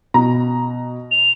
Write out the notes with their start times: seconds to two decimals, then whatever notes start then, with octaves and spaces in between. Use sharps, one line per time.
0.14 B2 A#5
1.11 F7